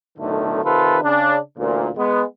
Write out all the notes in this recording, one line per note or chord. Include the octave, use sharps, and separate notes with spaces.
B1 A2 D3 D#3 A3
C3 D#3 F4 A4 B4
C#3 D4
A1 D2 A#2
G#3 B3